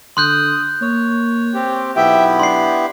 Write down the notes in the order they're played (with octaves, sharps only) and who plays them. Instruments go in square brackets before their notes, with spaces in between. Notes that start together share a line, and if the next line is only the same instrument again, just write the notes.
[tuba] D3 [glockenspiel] C6 F#6 G6 [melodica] D#6
[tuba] A#3 [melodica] C#5
[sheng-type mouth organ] C4 G4
[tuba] B1 [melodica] B3 E4 G4 [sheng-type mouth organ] E5 G5
[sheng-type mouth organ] D4 [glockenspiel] C6 C7